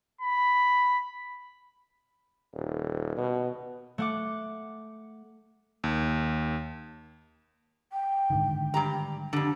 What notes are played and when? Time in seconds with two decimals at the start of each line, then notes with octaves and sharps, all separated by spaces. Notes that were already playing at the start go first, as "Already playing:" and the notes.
0.21 B5
2.54 D#1
3.17 B2
3.98 A3 F#5 D6
5.84 D#2
7.92 G5
8.30 G#2 D3 D#3
8.74 G2 G4 A#5
9.33 F2 D3 G4